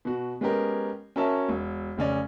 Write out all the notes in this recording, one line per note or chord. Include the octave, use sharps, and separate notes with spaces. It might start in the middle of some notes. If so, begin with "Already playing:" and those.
B2 F#4
G#3 B3 C#4 G4 A#4
C#4 F#4 A#4 C#5 E5 A5
E1
F1 C#3 C#4 D5